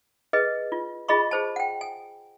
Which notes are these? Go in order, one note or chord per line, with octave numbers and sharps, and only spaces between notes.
G#4 B4 D#5
F4
F4 G#4 D#5 B5 C#6
G#4 C5 A5
F#5 G5
G#5